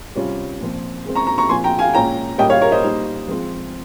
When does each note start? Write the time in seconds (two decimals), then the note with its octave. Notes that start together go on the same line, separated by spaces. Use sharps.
0.15 C3 G3 C#4 F4
0.60 A#2 F3 C4
1.05 C#3 G#3 C4
1.15 A#5 C#6
1.27 A#5 C#6
1.38 A#5 C#6
1.49 A#2 F3 C4 F4 G#5 C6
1.64 G5 A#5
1.79 F5 G#5
1.93 A#2 G#3 C#4 F4 G5 A#5
2.38 A#2 G3 A#3 C#4 D#5 G5
2.50 C#5 F5
2.61 A#4 C#5
2.72 C5 D#5
2.83 G3 A#3 D#4
3.28 F3 G#3 C4 F4